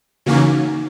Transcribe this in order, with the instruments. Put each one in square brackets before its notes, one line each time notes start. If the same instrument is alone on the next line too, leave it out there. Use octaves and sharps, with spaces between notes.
[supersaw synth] C#3 E3 A#3 C#4 [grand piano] D#4 F#4